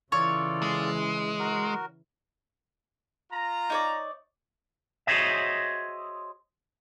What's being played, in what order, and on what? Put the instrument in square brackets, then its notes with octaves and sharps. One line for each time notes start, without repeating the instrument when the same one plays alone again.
[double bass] C#3 E3 [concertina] F4 A4 D5 [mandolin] C#5
[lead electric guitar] G#3
[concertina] F#4 A#4
[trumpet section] F4 A#5
[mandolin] D#4 C#5 D5
[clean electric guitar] F#4 G#4 C5 C#5 D#5 E5